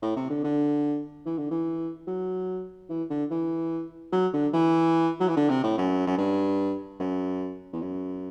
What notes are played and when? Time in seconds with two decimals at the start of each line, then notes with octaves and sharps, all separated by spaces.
0.02 A2
0.16 C3
0.30 D3
0.44 D3
1.26 E3
1.38 D3
1.51 E3
2.08 F#3
2.89 E3
3.10 D3
3.31 E3
4.13 F#3
4.34 D3
4.54 E3
5.20 F#3
5.28 E3
5.37 D3
5.50 C3
5.64 A2
5.78 F#2
6.07 F#2
6.18 G2
7.00 F#2
7.73 E2
7.82 F#2